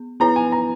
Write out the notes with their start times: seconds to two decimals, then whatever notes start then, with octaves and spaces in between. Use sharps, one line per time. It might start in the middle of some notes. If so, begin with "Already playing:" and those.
Already playing: B3
0.20 B3 E4 B4 A#5
0.36 G#5
0.52 A#5